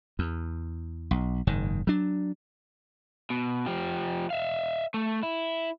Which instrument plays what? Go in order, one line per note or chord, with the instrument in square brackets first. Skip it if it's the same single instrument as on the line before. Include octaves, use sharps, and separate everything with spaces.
[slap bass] E2
B1
F#1 G#2 D#3
F#3 D4
[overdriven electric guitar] B2
F3 G4
E5 F5
A3
E4